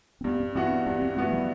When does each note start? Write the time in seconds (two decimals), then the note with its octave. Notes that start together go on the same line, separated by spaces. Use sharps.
0.21 C4
0.24 G2 B3
0.40 C4
0.55 E3 B3 C4 F#4
0.71 D4
0.87 G2 C4
1.02 C4
1.17 E3 A3 B3 F#4
1.33 F#3